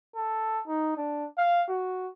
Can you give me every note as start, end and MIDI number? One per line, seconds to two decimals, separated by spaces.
0.16 0.62 69
0.67 0.96 63
0.97 1.26 62
1.38 1.64 77
1.69 2.09 66